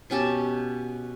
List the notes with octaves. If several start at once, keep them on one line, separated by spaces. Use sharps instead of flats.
B2 C#4 G4 A5